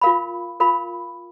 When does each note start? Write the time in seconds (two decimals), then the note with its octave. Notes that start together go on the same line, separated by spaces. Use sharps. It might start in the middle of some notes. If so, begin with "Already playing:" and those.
0.02 F4 A#4 F5 B5
0.60 F4 A#4 F5 B5